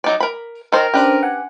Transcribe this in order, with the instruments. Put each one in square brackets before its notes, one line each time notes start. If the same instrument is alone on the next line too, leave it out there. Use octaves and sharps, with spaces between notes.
[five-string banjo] F#3 D#4 D5
A#4 B5
[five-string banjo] D#3 C5 [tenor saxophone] A#4
[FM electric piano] C#4 D4 C5 [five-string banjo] G4 B4
[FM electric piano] F#5 G#5